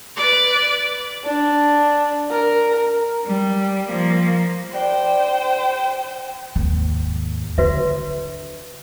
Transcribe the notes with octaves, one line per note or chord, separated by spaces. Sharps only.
B4 D5
D4
A#4
G3
F3 A#3
D4 G4 B4 C5 G5
D#2 G#2
D3 F#4 B4 E5